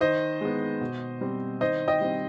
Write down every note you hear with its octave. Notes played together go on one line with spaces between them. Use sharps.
D#3 C5 D#5
G#3 B3
B2
G3 C4
D#3 C5 D#5
D#5 G5
G3 C4